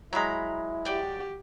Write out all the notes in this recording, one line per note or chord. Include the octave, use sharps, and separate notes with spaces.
F#3 G#3 E4 A#5 B5
F#4 G4 D5 G5